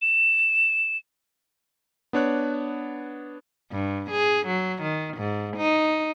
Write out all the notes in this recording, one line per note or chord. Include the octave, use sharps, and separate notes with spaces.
E7
B3 D4 C#5 F#6
G2
G#4
F#3
D#3
G#2
D#4